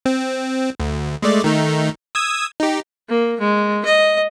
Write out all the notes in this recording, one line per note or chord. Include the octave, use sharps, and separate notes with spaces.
C4
D2
G#3 A3 D5
D#3 A3 D#4
D#6 E6 G#6
D#4 G4
A#3
G#3
D#5